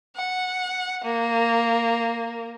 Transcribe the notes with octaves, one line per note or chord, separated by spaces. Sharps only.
F#5
A#3